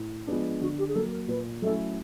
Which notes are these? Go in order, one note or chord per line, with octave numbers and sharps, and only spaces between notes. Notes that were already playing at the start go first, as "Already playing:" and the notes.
Already playing: A2
F3 G#3 B3 D4
D3 F#4
G4
G#4
F#3 A#3 A4
A#4
A#2 B4
F#3 A3 C#4 E4 A4